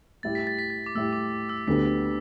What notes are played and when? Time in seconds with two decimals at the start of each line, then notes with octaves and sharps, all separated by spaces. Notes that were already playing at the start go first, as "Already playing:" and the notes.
0.23 A2 G3 E4 G4 A6
0.35 B6
0.47 A6
0.59 B6
0.70 A6
0.86 D6
0.95 A2 G3 E4 G4 E6
1.13 D6
1.49 E6
1.67 D2 D3 G3 B3 B6